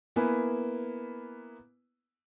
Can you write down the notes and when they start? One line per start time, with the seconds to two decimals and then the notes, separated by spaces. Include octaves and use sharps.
0.16 A#3 B3 E4 B4 G#5